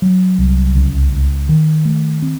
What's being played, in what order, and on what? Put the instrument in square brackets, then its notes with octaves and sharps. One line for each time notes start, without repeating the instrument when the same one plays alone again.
[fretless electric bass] F#3
C2
C#2
C#2
D#3
A3
C4